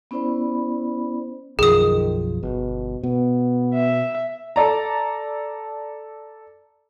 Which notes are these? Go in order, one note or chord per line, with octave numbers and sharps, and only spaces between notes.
B3 C#4 E4 C5 D5 B5
B1 F#2 D#3 F3 G#4 D#6
G1 B2
B2 B3
E5
A4 D5 A#5